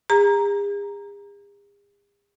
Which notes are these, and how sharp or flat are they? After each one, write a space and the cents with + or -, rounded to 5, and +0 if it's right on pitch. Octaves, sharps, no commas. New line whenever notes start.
G#4 -45 A#5 +0